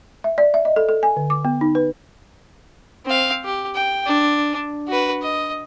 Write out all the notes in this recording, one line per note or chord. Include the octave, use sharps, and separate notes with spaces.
E5
D5
E5
D#5
A4
A4
G#5
D3
D6
B3
D#4
B4
C4 F5
G4
G5
D4
F#4 B4
D#5